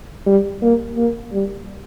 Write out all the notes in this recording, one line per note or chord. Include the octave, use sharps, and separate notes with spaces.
G3
A#3
A#3
G3